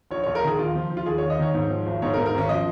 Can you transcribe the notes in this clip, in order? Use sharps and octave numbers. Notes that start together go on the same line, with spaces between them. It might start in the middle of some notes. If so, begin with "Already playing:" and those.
A#1 C#5
A#1 C#5
A#4
D#3 G#4
D#2 F4
F3
F3
F4
D#2 G#4
D#2 C#5
D#5
D#3 C#5
G#2
F3
G#1
G#2 C#5
A#4
G#2
A#4
G#1 C#4
F3 D#5